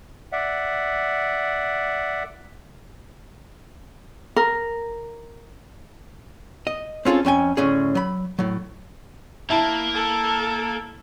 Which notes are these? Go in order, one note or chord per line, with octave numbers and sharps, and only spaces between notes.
D5 E5 F#5
A#4
D#5
C4 C#4 F4 G#4 A4
F2 C#4 G5 G#5
D2 A2 C#4 G#4
F#3 B5
A2 F#3
A#3 E4 A5
A4